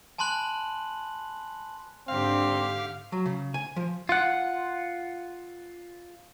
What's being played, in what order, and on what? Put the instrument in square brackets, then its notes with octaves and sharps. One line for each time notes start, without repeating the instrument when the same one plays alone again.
[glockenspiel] G#5 A5 B5 C6 F#6 F#7
[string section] G#2 D4 [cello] D3 G4 [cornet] C4 [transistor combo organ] F5
[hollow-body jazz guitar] F#3
C#3
G#5
F3
[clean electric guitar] F4 F#5